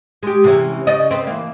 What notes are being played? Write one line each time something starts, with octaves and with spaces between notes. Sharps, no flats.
G#3 G4
C3 E3 C#4
C#3 D5 D#5
C4 B4
E3 A#3